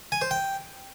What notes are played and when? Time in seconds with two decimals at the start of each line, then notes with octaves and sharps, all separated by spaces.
0.12 G#5
0.21 C5
0.31 G5